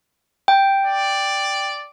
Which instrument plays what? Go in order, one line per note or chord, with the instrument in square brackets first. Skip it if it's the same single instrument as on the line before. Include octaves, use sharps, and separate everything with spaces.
[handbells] G5
[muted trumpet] D5